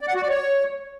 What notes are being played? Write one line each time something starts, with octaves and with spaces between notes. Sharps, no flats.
D5
F#5
F#4
D5
C#5